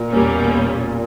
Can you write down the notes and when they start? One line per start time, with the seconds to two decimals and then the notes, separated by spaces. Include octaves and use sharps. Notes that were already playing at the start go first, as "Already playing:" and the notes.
Already playing: A#2
0.10 E2 B2 G3 A#3 C#4